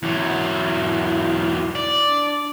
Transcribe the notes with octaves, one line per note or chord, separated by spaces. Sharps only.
E2 F#3 E4
D5
D4